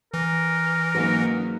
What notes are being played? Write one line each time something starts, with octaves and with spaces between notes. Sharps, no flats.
E3 A#4
G#2 F#3 A#3 C#4 B4